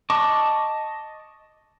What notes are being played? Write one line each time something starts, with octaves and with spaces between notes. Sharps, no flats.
D#5 A5 C#6 D6